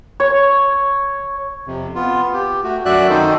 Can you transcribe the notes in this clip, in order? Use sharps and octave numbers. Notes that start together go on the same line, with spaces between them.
C#5
F2 C3
B3 F4
G4
A3 F#4
F#2 F#4 D5 E5 F#6
D#3 C4 D#4 A4 C5